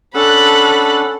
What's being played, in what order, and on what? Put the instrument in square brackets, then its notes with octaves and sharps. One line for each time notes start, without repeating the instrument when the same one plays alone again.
[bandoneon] C#4 D4 F#5 [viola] A4 [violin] B5 F#6